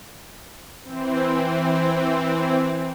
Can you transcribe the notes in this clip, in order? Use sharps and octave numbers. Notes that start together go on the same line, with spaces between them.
E3 C4